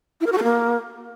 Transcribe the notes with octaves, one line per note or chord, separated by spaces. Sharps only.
E4
A#4
F#4
A4
A#3